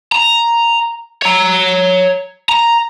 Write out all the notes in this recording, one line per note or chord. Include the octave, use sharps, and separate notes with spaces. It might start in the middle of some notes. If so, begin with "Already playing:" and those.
A#5
C#5 A#5
A#5